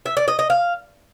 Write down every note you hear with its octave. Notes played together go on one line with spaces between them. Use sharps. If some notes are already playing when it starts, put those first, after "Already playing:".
E5
D5
D#5
D#5
F5